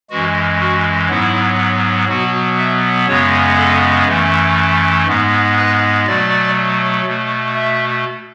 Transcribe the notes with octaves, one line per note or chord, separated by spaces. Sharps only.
F#2 E3 G#3 F#4
F#4
G#2 F#3 B3 E4
B2 F#3 B3 F#4
E5
F#2 C#3 G#3 B3 C#5
A4
F#2 E3 A3
G#2 G#3 B3
B4
B2 F#3 A3 D5
B2 A3
E5